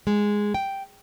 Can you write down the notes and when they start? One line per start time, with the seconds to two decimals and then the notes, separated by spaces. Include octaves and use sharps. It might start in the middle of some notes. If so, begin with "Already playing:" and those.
0.07 G#3
0.54 G5